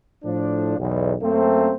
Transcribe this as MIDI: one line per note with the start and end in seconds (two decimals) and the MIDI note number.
0.24 0.76 45
0.24 0.76 53
0.24 0.76 62
0.79 1.14 35
0.79 1.14 40
1.22 1.74 42
1.22 1.74 57
1.22 1.74 58
1.22 1.74 60